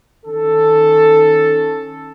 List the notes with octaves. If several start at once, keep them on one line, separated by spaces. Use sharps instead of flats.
D#3 C#4 A4